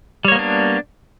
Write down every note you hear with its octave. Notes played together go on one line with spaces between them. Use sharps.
G3 A#3 B3 D4 C#5